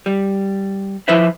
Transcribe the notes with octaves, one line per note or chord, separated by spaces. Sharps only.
G3
F3 E4 B4 C5 E5